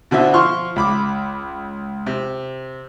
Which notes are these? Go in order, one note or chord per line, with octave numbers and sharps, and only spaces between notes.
B2 D3 C4 E5
F3 C6 C#6 F6
C#2 B5 D6
C3